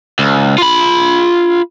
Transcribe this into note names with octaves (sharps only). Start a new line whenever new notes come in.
C#2
F4 B5